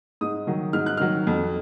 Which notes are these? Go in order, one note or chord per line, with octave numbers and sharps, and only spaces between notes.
G#2 D#6
D#3 F#3
G#2 F6
F#6
D#3 F#3 F6
F2